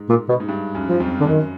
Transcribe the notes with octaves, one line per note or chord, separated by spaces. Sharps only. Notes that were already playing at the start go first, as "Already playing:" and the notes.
Already playing: G#2
A#2
B2
G#2
G2
F#2
F3
F2
D3
F#2 D#3